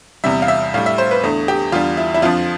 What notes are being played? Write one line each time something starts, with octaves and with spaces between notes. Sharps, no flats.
E2 C3 G3 E5
F5
E5
A2 G3 F5
E5
C5
B4
E2 D3 A3
G4
E2 D3 G3 F4
E4
E4
F2 D3 F3 F4